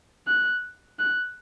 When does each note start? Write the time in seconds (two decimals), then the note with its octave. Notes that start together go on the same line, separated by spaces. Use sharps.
0.27 F#6
0.99 F#6